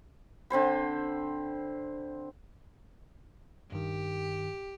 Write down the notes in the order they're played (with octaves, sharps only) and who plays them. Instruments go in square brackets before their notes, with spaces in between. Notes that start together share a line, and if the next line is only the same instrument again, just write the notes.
[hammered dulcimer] D3 C4 C5 B5
[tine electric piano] G2 D#3 [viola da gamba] G4